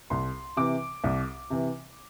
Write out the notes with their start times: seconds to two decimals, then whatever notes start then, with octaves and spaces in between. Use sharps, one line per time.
0.10 C2 C6
0.57 C3 E3 D6
1.04 C2
1.50 C3 E3